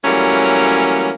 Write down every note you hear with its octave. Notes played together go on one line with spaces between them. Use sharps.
E3 F#3 G3 A3 A#3 C#4